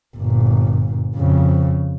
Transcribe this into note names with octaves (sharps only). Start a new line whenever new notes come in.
G1 A#2
F2 C#3